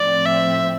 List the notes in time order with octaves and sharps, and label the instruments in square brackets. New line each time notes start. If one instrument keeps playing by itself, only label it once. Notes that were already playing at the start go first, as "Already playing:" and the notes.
Already playing: [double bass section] A2 F3 C4 [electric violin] D5
[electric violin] E5